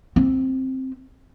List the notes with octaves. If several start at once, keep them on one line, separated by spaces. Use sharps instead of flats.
C4